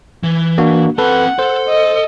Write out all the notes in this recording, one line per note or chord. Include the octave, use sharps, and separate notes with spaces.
E3
A#3 D4 F#4
C4 A4 B4 F#5 A5
A4 C5
D#5